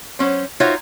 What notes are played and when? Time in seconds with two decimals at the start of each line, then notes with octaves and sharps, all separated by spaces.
0.19 F#3 C#4 C5
0.60 D#4 F4 F#4 C5 C#5 E5